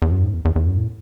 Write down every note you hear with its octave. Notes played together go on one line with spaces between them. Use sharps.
E2
F#2
G#2
E2
E2
E2
F#2
A2